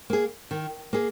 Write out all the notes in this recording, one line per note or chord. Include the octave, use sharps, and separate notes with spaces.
A#3 G#4
D#3
A#3 G#4